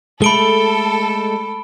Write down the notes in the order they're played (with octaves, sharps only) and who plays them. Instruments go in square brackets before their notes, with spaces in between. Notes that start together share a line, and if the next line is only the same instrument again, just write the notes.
[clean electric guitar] G#3 A3 [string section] A4 [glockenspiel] B5 D7 G7